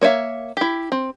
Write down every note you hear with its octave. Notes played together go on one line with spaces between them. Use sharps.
A#3 C#5 D5 E5 F5
E4 G4
C4